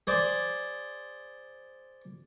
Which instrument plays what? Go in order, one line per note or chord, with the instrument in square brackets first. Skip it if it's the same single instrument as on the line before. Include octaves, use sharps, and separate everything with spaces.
[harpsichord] G#4 C5 D5